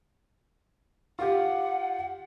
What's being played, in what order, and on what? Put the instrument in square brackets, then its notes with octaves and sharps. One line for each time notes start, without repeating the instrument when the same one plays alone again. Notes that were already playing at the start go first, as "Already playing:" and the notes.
[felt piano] F4 G4 [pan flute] F#5